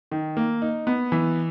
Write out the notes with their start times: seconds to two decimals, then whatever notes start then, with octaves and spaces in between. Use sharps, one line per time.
0.11 D#3
0.37 A#3
0.62 D#4
0.87 B3
1.12 E3